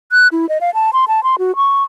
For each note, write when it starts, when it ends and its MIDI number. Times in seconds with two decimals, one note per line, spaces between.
0.12 0.28 90
0.32 0.49 64
0.49 0.58 75
0.61 0.70 77
0.74 0.90 81
0.93 1.05 84
1.08 1.23 81
1.23 1.36 84
1.39 1.56 66
1.56 1.83 85